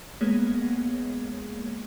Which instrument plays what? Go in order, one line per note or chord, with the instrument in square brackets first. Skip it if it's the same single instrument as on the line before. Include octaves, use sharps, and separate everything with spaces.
[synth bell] G#3 A#3 B3 G#4 C#5